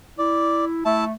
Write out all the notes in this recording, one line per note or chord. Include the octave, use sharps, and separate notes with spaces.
E4 D5
A3 E4 A5